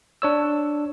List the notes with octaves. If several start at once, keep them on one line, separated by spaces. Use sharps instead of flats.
D4 C#5 E6